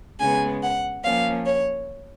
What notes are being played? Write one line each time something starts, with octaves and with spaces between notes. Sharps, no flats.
C#3 G#3 B3 G#5
F#5
F3 A#3 C#4 F5
C#5